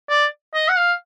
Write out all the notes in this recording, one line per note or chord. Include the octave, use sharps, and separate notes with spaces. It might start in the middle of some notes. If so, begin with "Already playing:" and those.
D5
D#5
F#5
F5